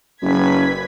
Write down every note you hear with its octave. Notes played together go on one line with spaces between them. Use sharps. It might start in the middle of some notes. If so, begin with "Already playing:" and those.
F#1 F#2 B4 G#6 B6